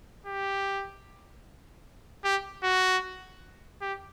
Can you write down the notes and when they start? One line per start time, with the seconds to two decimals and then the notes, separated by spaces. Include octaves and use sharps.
0.26 G4
2.24 G4
2.63 F#4
3.81 G4